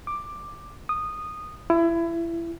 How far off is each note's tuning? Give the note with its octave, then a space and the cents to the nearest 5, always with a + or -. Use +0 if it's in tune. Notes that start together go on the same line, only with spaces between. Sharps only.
D6 +10
D#6 -15
E4 +25